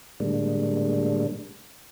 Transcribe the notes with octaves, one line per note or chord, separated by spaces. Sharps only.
A2 D3 G3 G#3 A#3 D4